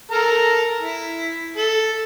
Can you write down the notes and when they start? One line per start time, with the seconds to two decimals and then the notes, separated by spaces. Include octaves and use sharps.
0.11 A4 A#4 A#5
0.81 E4
1.57 A4